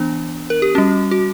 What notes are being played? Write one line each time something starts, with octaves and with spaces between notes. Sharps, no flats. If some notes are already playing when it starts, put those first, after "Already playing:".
Already playing: E3 B3 D4
A#4
G4
G3 C#4 F#4
F#4